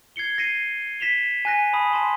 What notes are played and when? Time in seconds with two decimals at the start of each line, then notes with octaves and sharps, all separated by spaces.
0.16 G#6 C7 C#7 G7
0.38 A#6 C7 C#7 D#7
1.00 A#6 B6 E7 F7 G7
1.45 G#5 F#6 A#6
1.73 A5 B5 D#6
1.93 A5 C6